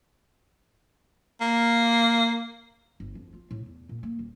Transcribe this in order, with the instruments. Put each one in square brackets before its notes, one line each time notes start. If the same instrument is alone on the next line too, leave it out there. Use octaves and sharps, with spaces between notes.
[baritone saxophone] A#3
[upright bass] G1
F2
F4
A2
E2
A#2
A#3
D#1